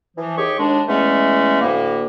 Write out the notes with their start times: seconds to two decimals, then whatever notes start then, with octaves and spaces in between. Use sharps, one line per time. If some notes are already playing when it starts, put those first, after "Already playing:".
0.17 E3 F3
0.37 D#2 G4 G#4 C#6
0.58 D#2 G#3 D4
0.88 E2 G#3 A3 C#4
1.62 D2 A2 A#3